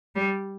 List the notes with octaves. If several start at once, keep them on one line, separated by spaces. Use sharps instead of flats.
G3